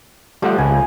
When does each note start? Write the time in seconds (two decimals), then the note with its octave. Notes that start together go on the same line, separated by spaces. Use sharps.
0.42 F3 G3 A3 F#5
0.58 C#2 G#5